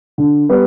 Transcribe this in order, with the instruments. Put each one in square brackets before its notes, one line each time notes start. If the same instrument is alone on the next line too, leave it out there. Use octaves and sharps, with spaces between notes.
[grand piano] D3
G3 B3